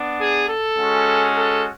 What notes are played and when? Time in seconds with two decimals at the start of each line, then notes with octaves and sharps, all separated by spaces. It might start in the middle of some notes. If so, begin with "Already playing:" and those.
Already playing: B3 D4
0.20 G#4
0.49 A4
0.77 G#3 C#4 F#4
1.34 A4